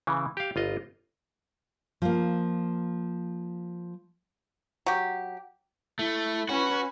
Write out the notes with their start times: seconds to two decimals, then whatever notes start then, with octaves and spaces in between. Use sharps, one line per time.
0.07 C#3 E3
0.37 G4 F5
0.56 G1 F4 D#5
2.02 F3 A#3
4.86 F#3 G4
5.99 A3 E4
6.49 C#4 F#4 B4